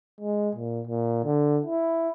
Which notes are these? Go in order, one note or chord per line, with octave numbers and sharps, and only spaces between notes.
G#3
A#2
A#2
D3
E4